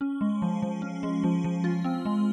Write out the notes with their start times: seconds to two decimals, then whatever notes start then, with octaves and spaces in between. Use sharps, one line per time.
0.01 C#4
0.21 G#3
0.42 F3
0.62 F3
0.82 C#4
1.03 G#3
1.24 F3
1.44 F3
1.64 F4
1.84 C4
2.05 G#3